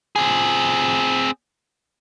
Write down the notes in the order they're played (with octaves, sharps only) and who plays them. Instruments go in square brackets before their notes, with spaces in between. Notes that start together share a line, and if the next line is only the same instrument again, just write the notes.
[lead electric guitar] C4 G#4